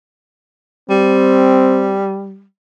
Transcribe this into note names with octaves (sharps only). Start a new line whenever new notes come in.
G3 C4